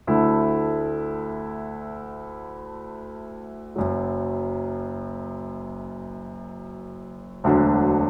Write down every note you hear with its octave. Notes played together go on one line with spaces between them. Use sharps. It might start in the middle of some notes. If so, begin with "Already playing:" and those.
D2 D3 A3 E4
F#1 F#2 F#3
E1 D2 D3 F#3 D4